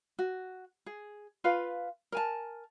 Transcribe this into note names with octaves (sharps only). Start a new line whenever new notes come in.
F#4
G#4
F4 B4 F5
A#4 G#5 A5